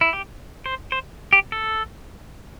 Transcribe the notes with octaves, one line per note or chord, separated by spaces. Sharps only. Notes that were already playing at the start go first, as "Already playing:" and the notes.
E4
G4
C5
C5
G4
A4